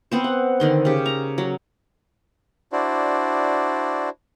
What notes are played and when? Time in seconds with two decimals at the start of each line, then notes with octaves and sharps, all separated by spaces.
0.11 B3 C4 C5
0.24 F#5
0.60 D3 D#3 C6
0.85 C#3 G4
1.06 A#5
1.38 F#3
2.72 D4 E4 F#4 C5 D5